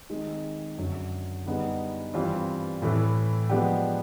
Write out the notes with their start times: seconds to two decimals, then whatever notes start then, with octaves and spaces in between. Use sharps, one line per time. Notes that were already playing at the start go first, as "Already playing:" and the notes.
0.10 D#3 G#3 C4 D#4
0.78 F#2 D3 F#3
1.46 D3 G3 B3 D#4 G#4
2.14 G2 E3 G3 C4 F4
2.82 A2 E3 A3
3.50 F3 G#3 B3 D4 G4